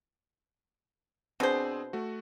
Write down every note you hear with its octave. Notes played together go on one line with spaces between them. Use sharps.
B2 C4 D4 G#4 C5
A3 F#4